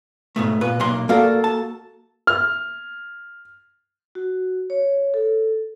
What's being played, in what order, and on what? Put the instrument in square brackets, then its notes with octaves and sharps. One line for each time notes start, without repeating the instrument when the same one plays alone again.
[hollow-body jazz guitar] G#2 B2 A3
A#2 B4
B1 A#3 C6
[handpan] A#3 F#4 A4 [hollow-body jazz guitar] A#4 D5 F5
[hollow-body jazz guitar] A5
[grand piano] F6
[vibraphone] F#4
C#5
A4